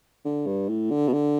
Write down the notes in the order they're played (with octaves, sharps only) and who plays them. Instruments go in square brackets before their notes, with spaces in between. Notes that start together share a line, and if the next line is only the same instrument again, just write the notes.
[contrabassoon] D3
G2
A2
D3
B2
D3